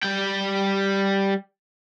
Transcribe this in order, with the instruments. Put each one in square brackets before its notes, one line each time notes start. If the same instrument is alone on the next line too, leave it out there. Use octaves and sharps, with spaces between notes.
[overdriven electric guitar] G3 G5